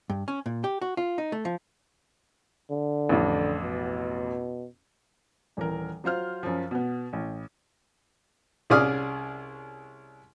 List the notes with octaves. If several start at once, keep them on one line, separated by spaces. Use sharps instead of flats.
G2
C#4
A#2
G4
F#4
F4
D#4
A3
F3
D3
A1 F2
B2
D#1 E3 A#4
F#3 F4 C5 F6
F#2 F3
B2 B3
A1
C2 C#4 G#4 D5 D#6 F6